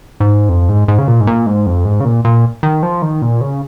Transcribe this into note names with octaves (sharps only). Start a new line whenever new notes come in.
G#2
F2
G#2
G#2
C#3
A#2
G#2
A#2
G#2
F2
G#2
C#3
A#2
A#2
D#3
F3
D#3
A#2
C#3